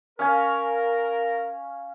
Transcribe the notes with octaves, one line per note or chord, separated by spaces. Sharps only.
C#4 A#4 F5 G#5